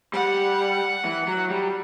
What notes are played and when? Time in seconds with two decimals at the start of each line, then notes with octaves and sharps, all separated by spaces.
0.13 G3 F#5
1.05 E3
1.28 F#3
1.51 G3